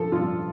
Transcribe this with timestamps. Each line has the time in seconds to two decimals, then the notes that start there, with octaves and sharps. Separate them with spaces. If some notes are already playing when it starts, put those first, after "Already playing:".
Already playing: F3 A4
0.12 G2 F4